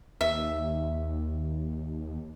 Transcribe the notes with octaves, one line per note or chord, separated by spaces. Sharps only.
D#2 E5